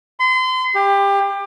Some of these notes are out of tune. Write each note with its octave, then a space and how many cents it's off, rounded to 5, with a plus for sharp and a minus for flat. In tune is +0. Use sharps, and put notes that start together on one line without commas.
C6 -35
G4 +25